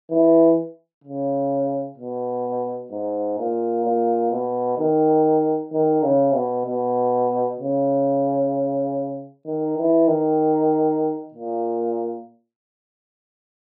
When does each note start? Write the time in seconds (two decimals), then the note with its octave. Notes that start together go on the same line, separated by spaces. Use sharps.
0.10 E3
1.04 C#3
1.97 B2
2.92 G#2
3.38 A#2
3.85 A#2
4.32 B2
4.78 D#3
5.72 D#3
6.03 C#3
6.34 B2
6.65 B2
7.60 C#3
9.46 D#3
9.78 E3
10.08 D#3
11.33 A#2